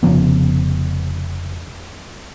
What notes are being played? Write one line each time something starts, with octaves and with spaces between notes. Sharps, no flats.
F1 C#3 F3 B3